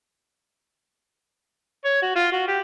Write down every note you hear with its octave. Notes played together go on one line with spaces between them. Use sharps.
C#5
F#4
F4
F#4
G4